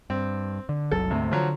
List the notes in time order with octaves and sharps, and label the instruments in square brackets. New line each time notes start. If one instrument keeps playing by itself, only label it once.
[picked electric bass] G2 [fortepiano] C4
[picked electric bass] D3
[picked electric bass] F#1 C2 F#3 [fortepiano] A4
[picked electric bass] D2 G#2 A3 [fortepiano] C3
[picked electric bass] D3 [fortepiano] F3 F#3